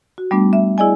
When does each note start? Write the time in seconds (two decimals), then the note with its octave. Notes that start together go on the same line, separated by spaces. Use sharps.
0.18 F#4
0.31 G3 A3 B3 D4
0.53 E5
0.78 E4 G#4 D5 D#5 G#5